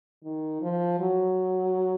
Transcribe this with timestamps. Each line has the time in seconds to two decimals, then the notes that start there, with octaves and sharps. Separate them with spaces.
0.23 D#3
0.62 F3
1.00 F#3